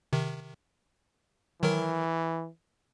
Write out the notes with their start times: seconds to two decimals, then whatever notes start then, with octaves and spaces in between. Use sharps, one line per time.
0.13 C3 D#3
1.62 D#3 E3 F#3 A#4